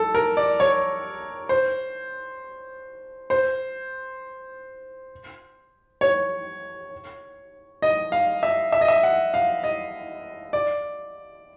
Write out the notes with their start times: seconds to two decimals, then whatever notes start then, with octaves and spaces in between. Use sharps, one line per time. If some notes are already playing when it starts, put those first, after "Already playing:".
Already playing: A4
0.14 A#4
0.37 D5
0.60 C#5
1.49 C5
3.30 C5
6.01 C#5
7.82 D#5
8.12 F5
8.43 E5
8.72 E5
8.81 D#5
8.88 E5
9.03 F#5
9.34 F5
9.63 D#5
10.53 D5